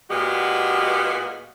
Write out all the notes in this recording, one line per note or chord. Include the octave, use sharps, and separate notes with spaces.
A#2 G#3 B3 F#4 G4